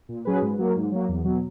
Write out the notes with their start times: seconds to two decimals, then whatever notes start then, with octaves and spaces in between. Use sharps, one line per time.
0.09 A#2
0.25 F#3 C#4 G#4 B4
0.42 G#2
0.58 F#3 A#3
0.76 G#2
0.92 F#3 A#3
1.09 E2
1.25 B2 F#3